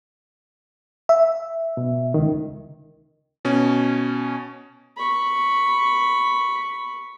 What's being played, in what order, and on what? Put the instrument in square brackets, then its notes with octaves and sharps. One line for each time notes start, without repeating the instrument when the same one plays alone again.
[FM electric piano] E5
[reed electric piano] B2
C#2 D#3
[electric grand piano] B2 C#4
[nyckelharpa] B5 C#6